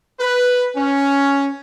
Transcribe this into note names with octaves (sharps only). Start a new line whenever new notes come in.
B4
C#4